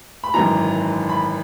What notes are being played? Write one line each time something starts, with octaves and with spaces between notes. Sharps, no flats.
B5
G#1 F#2 E3 A#5
B5